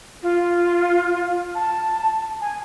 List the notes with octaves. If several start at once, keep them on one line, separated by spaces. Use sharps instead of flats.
F4
A5
G#5